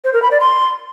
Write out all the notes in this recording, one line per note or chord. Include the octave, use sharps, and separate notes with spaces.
C5
A#4
B5
D5
C6